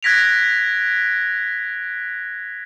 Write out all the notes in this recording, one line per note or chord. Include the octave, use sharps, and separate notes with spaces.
F#6 G#6 A#6 B6 D7 F7